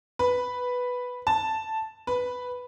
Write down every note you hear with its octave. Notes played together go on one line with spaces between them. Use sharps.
B4
A5
B4